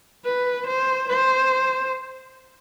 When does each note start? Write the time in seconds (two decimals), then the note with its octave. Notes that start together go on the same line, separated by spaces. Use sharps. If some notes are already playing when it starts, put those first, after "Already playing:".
0.25 B4
0.67 C5
1.09 C5